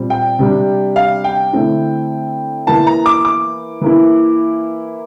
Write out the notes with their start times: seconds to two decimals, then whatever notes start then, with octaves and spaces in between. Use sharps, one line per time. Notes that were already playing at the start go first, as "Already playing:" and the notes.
Already playing: A#2 G3 C4
0.10 G5
0.39 C3 G3 D4
0.96 F5
1.24 G5
1.53 D3 A3 C4 E4
2.67 E3 A#3 E4 A5
2.87 A#5
3.06 D6
3.25 D6
3.81 E3 A#3 E4